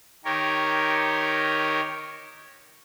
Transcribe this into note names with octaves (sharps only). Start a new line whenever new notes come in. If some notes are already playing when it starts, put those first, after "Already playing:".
D#3 G4 A#4 C#5